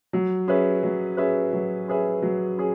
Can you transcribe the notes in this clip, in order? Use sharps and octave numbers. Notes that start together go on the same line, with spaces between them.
F#3
C#4 G#4 B4 E5
F#3
C#4 G#4 B4 E5
F#3
C#4 G#4 B4 E5
F#3
C#4 G#4